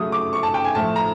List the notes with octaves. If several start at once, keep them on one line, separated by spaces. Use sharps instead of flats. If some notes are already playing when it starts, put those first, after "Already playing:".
Already playing: C#3 F#3 A3 D#6
D6
C#6
A5
G5
G#5
A2 F3 A3 A5
A#5